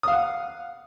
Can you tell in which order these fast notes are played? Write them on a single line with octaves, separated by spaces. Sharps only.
D#6 F5 F#5